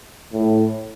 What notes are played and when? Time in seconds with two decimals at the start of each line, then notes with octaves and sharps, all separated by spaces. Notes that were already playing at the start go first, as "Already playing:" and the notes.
0.33 A2